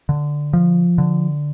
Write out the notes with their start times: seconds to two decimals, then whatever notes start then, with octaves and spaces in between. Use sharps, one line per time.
0.09 D3
0.53 F3
0.98 D3